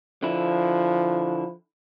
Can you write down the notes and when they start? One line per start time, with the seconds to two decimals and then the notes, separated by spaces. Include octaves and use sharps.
0.23 D3 F3 E4